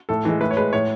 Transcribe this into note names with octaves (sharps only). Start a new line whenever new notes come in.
A2 A4
E3 G#3
A2 B4
C#5
G#3 B4
A2 C#5